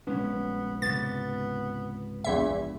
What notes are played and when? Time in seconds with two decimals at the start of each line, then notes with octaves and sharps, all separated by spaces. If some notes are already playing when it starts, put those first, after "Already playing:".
0.07 A#1 G#3 B3 C#4
0.82 C#2 G#2 C3 B3 A6
2.24 A#1 E2 E5